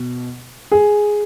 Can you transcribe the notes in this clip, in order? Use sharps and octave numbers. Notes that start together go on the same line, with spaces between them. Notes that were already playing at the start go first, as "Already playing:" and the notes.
Already playing: B2
G#4